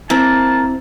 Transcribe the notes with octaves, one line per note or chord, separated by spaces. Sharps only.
A#3 C4 E4 A5